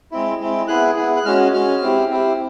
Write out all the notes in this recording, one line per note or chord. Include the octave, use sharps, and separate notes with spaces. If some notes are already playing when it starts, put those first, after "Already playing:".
G#3 C4 E4
G#3 C4 E4
B3 E4 G#4 F#6
B3 E4 G#4
F#6
G#3 C#4 F#4 F6
G#3 C#4 F#4 F6
C4 E4 G4
C4 E4 G4